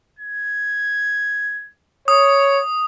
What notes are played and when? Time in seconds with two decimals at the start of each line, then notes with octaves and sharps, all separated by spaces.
0.19 G#6
2.08 C#5 D#6